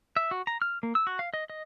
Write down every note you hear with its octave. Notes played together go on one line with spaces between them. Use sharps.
E5
F#4
A#5
F6
A#3
E6
F#4
F5
D#5
D#5